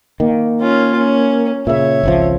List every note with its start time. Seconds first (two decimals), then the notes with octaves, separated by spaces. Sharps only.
0.20 D#3 A#3
0.61 C#4 F4
0.97 C#4
1.67 A#2 C#3 C#5 E5
2.03 G#1 C#2 F3